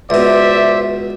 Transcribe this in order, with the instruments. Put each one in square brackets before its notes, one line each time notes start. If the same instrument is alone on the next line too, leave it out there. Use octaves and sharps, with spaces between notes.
[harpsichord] C#2 B2 [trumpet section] C5 D5 E5